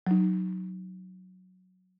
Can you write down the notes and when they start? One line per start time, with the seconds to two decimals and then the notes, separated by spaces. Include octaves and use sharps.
0.07 F#3 D#4